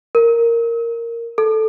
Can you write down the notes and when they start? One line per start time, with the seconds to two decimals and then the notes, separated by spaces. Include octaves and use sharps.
0.15 A#4
1.38 A4